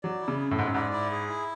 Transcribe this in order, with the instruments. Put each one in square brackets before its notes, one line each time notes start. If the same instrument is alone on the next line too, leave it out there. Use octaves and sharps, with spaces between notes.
[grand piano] F#3 [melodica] D5
[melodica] E4
[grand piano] C#3
[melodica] G#4
[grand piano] A2
[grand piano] G#2 [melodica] E4
[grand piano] F#2
[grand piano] G#2 [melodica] D5
[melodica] E4
G#4
E4